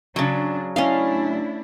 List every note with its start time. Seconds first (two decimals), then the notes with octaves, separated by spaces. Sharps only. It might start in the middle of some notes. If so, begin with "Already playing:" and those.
0.16 C#3 F#3 D4
0.76 A3 C#4 D4 E4 D#5 F5